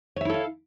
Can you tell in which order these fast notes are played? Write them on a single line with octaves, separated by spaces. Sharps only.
C#5 E5 E4 A4 F5